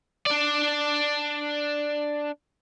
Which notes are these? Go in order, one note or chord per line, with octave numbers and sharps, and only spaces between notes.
D4 D5